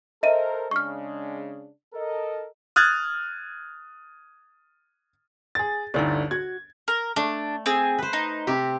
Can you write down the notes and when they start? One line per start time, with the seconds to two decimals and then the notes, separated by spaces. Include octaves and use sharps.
0.23 A4 A#4 C5 D#5 E5 D#7
0.71 C#3 G#3 D4 C#6 F6
1.94 A4 A#4 D#5
2.76 D#6 F6 F#6 G#6 A6
5.55 G#4 A6
5.94 G1 D2 D#4 E4 D5
6.31 F#4 G#6
6.88 A#4
7.16 A3 D4
7.66 C4 G#4
7.98 B4 C5
8.13 D#4
8.47 C3 C4 G4